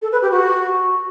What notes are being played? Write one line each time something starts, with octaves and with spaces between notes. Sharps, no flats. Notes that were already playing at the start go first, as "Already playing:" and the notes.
A4
B4
G4
F#4